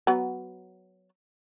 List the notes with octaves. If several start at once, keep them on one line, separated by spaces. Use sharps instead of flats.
F#3 B3